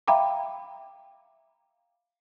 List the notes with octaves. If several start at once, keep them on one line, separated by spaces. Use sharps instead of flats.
E5 F5 G5 A#5 B5 D6